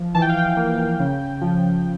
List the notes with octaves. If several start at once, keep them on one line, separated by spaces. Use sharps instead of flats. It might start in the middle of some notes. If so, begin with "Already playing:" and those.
Already playing: F3
E3 A5
G5
F5
G5
A#3
C#3
F3